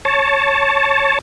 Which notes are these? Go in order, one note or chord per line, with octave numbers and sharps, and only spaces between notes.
C#5 A5